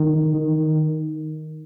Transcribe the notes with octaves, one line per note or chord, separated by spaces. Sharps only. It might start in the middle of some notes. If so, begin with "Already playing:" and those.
Already playing: D#3
D#3